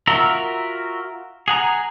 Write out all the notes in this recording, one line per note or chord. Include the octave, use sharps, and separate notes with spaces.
F4 F#4 A#4 E5 A#5
G#4 F#5 A#5